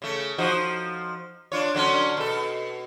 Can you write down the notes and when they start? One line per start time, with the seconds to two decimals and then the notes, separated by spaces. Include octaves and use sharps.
0.02 C#3 A3
0.38 F3 D#4 F#4
1.52 D4 F4 C#5
1.74 D3 F#3 C#4
2.17 B2 A4